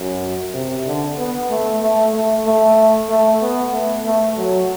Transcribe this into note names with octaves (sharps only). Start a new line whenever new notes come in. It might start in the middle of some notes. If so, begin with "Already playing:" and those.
Already playing: F#2
C3
D3
B3
A3
A3
A3
A3
A3
B3
A3
A3
F#3